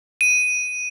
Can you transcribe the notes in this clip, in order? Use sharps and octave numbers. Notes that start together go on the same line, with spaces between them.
D#7